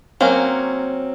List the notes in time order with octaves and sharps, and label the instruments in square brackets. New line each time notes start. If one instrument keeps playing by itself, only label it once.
[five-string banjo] F#3 A#3 C#4 [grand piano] C4